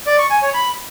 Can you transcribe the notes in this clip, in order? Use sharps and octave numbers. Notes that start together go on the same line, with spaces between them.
D5
C#6
G#5
C#5
B5